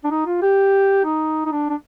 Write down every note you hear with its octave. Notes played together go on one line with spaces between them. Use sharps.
D4
D#4
F4
G4
D#4
D#4
D4
D4